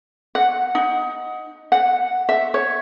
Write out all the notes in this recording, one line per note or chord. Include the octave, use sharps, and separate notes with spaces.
F#5
D#4
F#5
E5
C#5